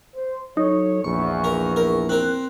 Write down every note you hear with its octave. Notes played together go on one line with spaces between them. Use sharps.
C5
F#3 D#4 A4 C#5
A#1 E2 C#6
A#4
A#4
C4 A#4 F#6